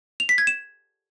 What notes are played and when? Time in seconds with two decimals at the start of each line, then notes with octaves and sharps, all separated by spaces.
0.20 F7
0.29 B6
0.38 G#6
0.47 E7